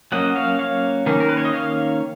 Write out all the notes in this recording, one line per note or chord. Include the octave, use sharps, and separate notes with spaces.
F#3 A#3 C#4 D#5 F#5
C#5 F5
C#5 F5
D#3 A#3 C#4
A#4
B4
C#5
D#5
C#5 F5